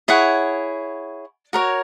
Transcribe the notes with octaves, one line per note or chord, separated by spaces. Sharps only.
E4 G#4 C#5 F#5
F#4 A#4 C#5